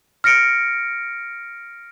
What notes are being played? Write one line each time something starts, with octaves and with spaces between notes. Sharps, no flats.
F6 A#6 C#7 D7